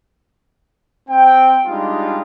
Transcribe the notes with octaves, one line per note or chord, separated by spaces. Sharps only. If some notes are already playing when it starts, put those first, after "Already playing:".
C4 G5
G3 G#3 D4 D#4 F4